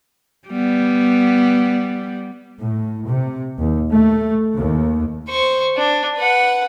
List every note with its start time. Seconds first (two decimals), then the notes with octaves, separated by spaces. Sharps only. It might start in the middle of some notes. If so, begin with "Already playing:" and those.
0.48 G3 B3
2.61 A2
3.06 C3
3.58 D#2
3.91 A3
4.59 D#2
5.29 C5 C#6
5.77 D4
6.18 B4 F#5